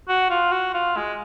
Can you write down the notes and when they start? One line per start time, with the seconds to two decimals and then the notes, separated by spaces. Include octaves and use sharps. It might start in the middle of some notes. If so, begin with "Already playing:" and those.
0.09 F#4
0.30 F4
0.52 F#4
0.74 F4
0.96 G#3